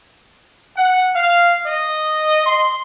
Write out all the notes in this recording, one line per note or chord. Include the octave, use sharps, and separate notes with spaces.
F#5
F5
D#5
C6